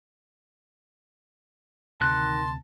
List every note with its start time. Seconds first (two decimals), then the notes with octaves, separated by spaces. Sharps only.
2.01 D2 C3 D#3 A5 C6 F#6